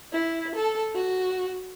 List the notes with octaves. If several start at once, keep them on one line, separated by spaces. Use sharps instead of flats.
E4
A4
F#4